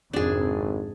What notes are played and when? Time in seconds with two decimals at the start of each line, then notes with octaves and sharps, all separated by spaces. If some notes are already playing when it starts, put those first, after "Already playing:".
0.13 G#1 F2 G#2 C3 D4 G#4